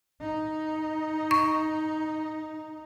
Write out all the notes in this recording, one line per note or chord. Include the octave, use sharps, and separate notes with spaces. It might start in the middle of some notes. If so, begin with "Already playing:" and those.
D#4
C#6